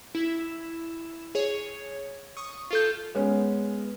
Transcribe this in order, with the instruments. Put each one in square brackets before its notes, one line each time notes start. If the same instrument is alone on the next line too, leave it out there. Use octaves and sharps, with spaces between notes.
[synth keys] E4 E7
G#4 C#5
C#6 D#6
F4 A4 G6
[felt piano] G#3 B3 C#4